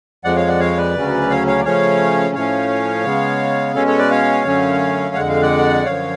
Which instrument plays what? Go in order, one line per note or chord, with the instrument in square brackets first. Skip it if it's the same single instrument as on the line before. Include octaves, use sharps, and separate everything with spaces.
[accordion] F2 F3 G#3 D5 F#5
C#5 F5
D5 F#5
C#5 F5
B4 D5
D2 C#3 F#3 C#4
C#5 F5
C#5 F5
D5
C#3 F3 A3 C#4 C#5 F5
A2 F3 A3 C#4 C#5 F5
C#3 G#3 B3
B2 G#3 C#4 A4 C#5
A4 C#5
B4 D5
C#5 F5
F#2 D3 F#3 A3 C#4
F2 D3 G#3 F#5
F5
D5 F#5
F#2 D3 F3 C#5 F5